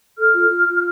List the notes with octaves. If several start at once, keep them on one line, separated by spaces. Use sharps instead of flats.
A4 F6
F4
F4
F4